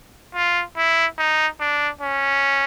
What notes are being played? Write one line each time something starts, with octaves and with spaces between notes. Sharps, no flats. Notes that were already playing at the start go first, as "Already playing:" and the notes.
F4
E4
D#4
D4
C#4